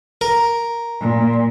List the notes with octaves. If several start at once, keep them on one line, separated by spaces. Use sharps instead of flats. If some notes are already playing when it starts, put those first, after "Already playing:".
A#4
A#2